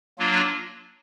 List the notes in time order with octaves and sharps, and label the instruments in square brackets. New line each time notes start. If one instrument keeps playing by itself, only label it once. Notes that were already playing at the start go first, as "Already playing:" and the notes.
[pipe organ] F#3 A#3 D4 F4